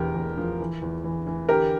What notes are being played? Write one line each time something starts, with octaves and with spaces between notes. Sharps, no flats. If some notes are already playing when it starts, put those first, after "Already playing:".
Already playing: E1 E2 G4 A#4
E2
F3
E3
E2
E3
E3
D3 G4 A#4